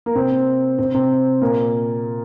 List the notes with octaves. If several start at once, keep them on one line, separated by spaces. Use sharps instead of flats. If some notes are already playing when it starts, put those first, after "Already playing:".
A#3
C3 C4
C3 C4
C3 C4
A#2 A#3